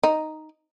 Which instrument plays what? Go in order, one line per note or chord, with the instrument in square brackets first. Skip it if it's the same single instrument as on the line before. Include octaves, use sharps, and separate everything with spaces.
[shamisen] D#4